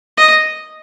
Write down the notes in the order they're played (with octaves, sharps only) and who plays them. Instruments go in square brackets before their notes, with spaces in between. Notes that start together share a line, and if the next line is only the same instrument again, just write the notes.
[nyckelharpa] D#5